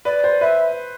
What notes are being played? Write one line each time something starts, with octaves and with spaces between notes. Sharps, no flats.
B4 D5
C5
B4 E5